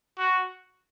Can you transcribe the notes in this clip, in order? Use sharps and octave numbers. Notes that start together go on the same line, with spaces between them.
F#4